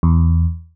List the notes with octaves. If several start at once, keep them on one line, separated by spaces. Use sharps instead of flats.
E2